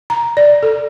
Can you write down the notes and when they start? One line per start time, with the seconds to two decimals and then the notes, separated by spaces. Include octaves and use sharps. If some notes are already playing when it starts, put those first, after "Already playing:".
0.10 A#5
0.37 D5
0.63 A4